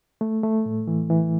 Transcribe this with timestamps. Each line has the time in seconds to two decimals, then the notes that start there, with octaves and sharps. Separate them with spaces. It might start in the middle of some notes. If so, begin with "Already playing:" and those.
0.21 A3
0.43 A3
0.66 A2
0.87 E3
1.10 E3